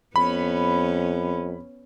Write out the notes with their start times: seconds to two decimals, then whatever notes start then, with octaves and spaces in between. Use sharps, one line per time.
0.16 F2 B3 C#4 B5